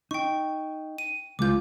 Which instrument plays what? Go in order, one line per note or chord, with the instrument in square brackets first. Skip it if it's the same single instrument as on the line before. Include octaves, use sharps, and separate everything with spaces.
[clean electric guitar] D#4 [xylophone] G5 C#6
[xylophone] D#7
[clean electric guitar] C#2 G#3 F4 [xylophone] D6 G6